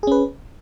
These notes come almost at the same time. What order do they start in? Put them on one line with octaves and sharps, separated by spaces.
G#4 C#4 B4